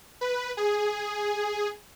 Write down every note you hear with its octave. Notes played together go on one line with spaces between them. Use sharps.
B4
G#4